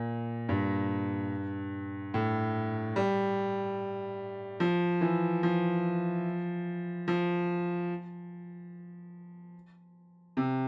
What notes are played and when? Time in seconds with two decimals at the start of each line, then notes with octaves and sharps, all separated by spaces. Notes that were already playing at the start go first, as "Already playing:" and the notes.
Already playing: A#2
0.49 G2
2.14 A2
2.96 G3
4.60 F3
5.01 E3
5.43 F3
7.08 F3
10.37 C3